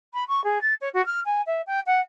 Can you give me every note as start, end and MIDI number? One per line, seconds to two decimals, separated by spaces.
0.13 0.24 83
0.28 0.43 85
0.44 0.61 68
0.61 0.73 93
0.81 0.88 73
0.93 1.04 66
1.06 1.20 89
1.25 1.41 80
1.46 1.61 76
1.67 1.80 79
1.86 2.00 78